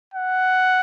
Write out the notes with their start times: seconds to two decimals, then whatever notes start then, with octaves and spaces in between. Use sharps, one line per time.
0.14 F#5